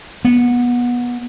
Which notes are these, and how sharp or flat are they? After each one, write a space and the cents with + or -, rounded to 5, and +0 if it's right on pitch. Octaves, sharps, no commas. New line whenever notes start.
B3 -20